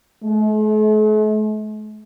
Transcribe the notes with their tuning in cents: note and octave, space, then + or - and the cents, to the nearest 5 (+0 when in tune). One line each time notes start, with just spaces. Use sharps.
A3 -45